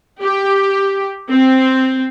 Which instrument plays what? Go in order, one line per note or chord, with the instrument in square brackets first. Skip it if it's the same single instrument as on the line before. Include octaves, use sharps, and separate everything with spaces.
[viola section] G4
C4